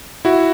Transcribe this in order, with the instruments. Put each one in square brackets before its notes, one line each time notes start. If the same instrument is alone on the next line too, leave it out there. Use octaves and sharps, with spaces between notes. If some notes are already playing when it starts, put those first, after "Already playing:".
[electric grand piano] E4 F#4